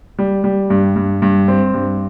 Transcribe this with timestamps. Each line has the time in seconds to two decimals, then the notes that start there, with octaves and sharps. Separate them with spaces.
0.19 G3
0.44 G3
0.70 G2
0.96 G2
1.22 G2
1.48 C4
1.74 G2